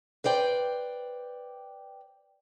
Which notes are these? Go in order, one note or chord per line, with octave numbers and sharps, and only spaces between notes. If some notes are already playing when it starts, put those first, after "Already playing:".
B4 C5 D5 G5